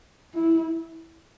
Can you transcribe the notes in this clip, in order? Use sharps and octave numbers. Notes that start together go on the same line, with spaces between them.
E4